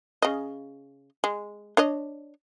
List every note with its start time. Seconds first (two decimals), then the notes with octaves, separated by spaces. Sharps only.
0.22 C#3 D#5
1.24 G#3
1.77 D4 C#5 D#5